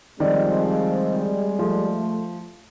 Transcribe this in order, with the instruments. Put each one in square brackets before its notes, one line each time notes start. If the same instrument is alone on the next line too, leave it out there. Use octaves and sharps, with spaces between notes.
[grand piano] D#3 D5 [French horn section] F3 C4 [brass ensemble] G3 G#3
[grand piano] F3 [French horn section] A3